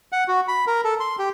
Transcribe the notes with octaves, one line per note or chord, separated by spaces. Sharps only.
F#5
F#4
B5
A#4
A4
C6
G4